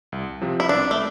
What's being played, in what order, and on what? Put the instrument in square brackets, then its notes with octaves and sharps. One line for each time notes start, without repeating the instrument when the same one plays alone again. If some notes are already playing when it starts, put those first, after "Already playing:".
[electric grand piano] C2
C3 F3 C4 G4
[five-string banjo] E4
[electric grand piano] C2 [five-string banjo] D4
[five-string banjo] A3